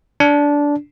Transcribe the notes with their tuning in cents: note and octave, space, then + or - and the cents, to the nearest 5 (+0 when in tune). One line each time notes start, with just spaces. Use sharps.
D4 -15